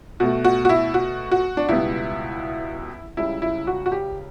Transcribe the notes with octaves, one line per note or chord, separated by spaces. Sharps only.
B2 A3 F#4
F#4
F#4
E4
F#4
F#4
D4
C#2 B2 G3 B3 E4
C#2 C#3 G3 E4
E4
F#4
F#4
G4